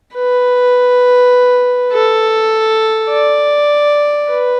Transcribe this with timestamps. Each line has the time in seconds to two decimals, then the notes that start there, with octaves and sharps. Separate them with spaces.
0.14 B4
1.92 A4
3.10 D5
4.29 B4